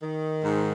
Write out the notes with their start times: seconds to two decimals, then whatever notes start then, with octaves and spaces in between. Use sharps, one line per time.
0.03 D#3
0.43 G#2